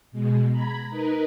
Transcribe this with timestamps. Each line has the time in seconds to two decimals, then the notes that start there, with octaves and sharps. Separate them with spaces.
0.12 B2 G#3
0.50 A#5 B5 G#6
0.89 D#4 A#4 B4